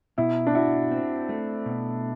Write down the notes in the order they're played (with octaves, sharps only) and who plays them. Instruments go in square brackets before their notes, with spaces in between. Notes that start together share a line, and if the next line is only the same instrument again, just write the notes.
[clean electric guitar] B2 [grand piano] E4
[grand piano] D4
[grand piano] E4 [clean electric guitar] F#4
[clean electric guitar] C4
A3
B2